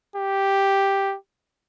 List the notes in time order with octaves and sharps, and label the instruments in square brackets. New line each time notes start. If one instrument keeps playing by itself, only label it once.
[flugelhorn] G4